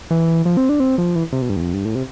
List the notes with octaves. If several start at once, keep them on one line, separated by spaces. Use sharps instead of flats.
E3
F3
C4
D4
C4
F3
E3
C3
B2
G2
E2
F2
G2
A2
C3